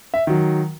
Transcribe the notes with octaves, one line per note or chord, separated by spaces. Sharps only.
E5
D#3 F#3